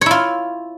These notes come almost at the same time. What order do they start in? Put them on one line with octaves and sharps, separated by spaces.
C#5 E4 F4